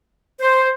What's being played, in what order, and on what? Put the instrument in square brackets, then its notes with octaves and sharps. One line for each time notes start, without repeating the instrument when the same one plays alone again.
[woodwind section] C5